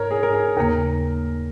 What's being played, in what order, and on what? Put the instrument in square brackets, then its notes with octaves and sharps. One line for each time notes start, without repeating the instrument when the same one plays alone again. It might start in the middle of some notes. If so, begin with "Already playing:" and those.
Already playing: [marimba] G#2 [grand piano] A#4 C#5
[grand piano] G#4
A#4
G#4
[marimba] D#2 C#3 A#3 [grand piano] A#4